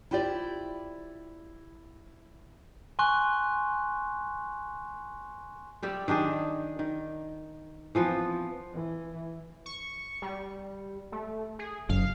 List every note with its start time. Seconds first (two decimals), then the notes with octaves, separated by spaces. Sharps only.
0.11 E4 F4 G4 C5 D5
2.99 G#5 C6 C#6 F#6
5.83 G3 G4 D5 E5
6.08 D#3 D4 G4 G#4
6.79 D#3
7.95 E3 F3 B3 C4
8.74 E3
9.66 C#6
10.22 G3
11.12 A3
11.59 G#4
11.89 F#1 F5